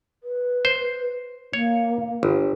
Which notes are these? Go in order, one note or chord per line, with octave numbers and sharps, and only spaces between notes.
B4
C5
A#3 C#5
G1